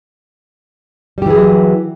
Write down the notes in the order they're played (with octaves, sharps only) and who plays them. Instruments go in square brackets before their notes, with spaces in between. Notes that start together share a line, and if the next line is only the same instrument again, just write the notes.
[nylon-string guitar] G3
G4
E3
G#4
F#3